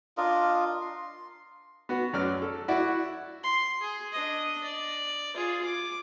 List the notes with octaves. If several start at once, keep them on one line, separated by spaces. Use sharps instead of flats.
D4 F4 A#4 D#5
C6
B3 F#4
F#2 F#3 D5 F6
A4
E4 F#4 D5 E5 F#5
C6
G#4
D4 D#5
D5
F4 G#4
D6